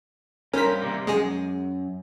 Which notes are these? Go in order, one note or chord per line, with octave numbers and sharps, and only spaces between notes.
G2 C#4 A#4 C5 B6
C3 G3 A#3
F#2 G#3 G#4